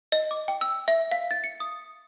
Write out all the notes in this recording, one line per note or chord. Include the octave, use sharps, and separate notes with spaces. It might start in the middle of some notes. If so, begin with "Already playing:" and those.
D#5
D6
G5
E6
E5
F5
A6
C#7
D#6